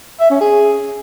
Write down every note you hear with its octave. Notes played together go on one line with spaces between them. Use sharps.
E5
C#4
G#4